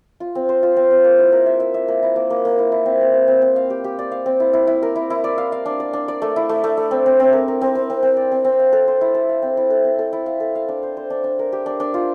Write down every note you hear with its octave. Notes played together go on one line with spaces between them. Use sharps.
F4
C4
C5
F4
C4
C4
A#3
E4
A#4
E5
E5
E5
A#3
E4
A#3
A#3
A#3
E4
E4
C4
C4
C4
C4
C4
F5
G4
G4
D5
F5
C4
E4
E4
E4
A#4
E4
E4
D5
F5
F5
D4
D5
D4
D5
A3
E4
A3
A3
A3
C4
C4
C4
A#4
A#4
C4
C4
C4
C4
D5
C4
C4
F5
A4
C5
E4
A4
F5
C4
E4
A4
C4
A4
E4
F5
A4
F5
D4
C5
C5
D4
D4
A#4
G4
D4
D4
F4